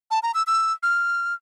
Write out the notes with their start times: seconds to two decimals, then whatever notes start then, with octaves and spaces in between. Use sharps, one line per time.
0.11 A5
0.23 A#5
0.34 E6
0.47 E6
0.83 F6